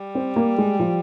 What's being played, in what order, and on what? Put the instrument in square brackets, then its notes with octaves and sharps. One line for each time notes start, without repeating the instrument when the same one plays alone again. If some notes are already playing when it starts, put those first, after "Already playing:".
Already playing: [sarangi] G3
[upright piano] C4
A#3
G#3
F3